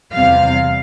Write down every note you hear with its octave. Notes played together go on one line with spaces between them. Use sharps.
E2 C3 G3 C4 F5